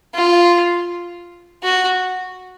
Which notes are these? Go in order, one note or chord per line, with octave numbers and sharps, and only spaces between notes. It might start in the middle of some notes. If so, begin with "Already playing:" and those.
F4
F#4